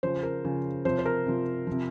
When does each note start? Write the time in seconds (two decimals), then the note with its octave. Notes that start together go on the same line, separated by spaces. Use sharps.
0.03 C#3 F3 C5
0.23 A#4
0.44 C#3 F3
0.85 C3 F3 C5
0.99 C5
1.06 A#4
1.26 C3 F3
1.67 C3 F3